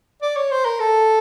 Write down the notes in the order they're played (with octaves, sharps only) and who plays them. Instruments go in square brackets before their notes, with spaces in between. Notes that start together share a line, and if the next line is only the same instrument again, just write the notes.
[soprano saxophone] D5
C#5
C5
A#4
A4